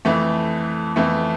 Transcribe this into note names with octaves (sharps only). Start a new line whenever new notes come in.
F2 E3 A3
F2 E3 A3